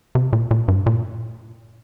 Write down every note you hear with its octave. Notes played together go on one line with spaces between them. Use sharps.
C3
A#2
A#2
G2
A#2